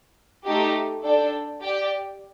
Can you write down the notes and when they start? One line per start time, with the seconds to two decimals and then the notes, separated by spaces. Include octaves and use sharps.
0.45 A3 D#4 G4
1.02 D4 A4 D5 G5
1.61 G4 D5 G5